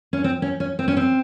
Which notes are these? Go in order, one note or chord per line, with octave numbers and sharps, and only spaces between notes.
C#4
C4
C#4
C#4
C4
C#4
C4